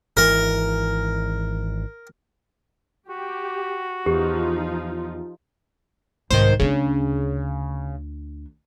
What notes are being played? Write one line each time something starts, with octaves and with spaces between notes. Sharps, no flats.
G#1 E3 A#4
F#4 G4
E2 F3 D#4 F4 G4
C2 G#2 D#3 C5
D2 C#3 D4